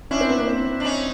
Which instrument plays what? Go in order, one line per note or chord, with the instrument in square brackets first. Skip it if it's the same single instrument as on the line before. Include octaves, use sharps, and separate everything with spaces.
[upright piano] C#4 [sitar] D4 E4
[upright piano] C4
B3
A#3
C4
[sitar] D4
C#4 D#4